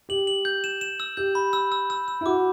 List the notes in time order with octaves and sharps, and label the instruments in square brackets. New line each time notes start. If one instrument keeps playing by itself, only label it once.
[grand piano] G4 [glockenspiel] F#7
[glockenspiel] F#7
G6
E7
E7
E6
[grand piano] G4 [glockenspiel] G6
[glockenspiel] B5
E6
E6
E6
E6
[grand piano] E4
[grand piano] F#4 [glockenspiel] D6